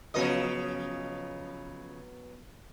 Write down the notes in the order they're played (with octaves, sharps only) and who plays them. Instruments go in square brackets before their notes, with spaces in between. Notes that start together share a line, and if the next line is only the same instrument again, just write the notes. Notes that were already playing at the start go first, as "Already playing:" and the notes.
[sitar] C#3 F3 D#5 [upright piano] F#3 B3 C#4